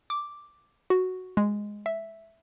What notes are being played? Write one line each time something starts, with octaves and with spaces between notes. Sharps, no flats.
D6
F#4
G#3
E5